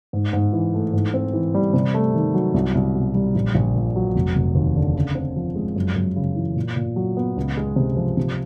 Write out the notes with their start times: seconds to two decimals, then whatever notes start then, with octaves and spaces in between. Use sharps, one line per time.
0.13 G#2
0.33 G#2
0.53 E3
0.74 A3
0.93 G#2
1.14 C4
1.33 E3
1.54 G3
1.74 C3
1.94 A3
2.14 D#3
2.34 F#3
2.54 C2
2.75 C2
2.95 B2
3.15 G3
3.35 A#1
3.54 A#1
3.75 A#2
3.96 F#3
4.15 F1
4.35 F1
4.55 D#2
4.76 D3
4.96 C#3
5.15 C4
5.36 F3
5.56 G#3
5.76 F#2
5.96 F#2
6.16 C#3
6.36 E3
6.56 A#2
6.76 A#2
6.96 F#3
7.17 B3
7.37 C#2
7.57 G#3
7.76 C3
7.97 F3
8.17 C3